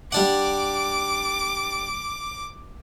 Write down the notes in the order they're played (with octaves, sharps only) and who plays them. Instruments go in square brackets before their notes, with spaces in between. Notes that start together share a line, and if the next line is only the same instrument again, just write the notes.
[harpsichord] G3 D4 F#5 [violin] D6